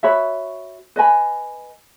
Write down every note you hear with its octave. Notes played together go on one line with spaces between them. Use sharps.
F#4 C#5 E5 B5
B4 D#5 G#5 B5